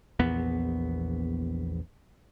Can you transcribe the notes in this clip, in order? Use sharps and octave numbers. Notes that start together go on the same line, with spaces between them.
A#1 E2 B3